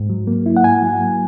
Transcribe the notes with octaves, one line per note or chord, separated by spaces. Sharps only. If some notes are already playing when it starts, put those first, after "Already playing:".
Already playing: G#2
F#3
A#3
E4
F#5
G#2 G#5
F#3
A#3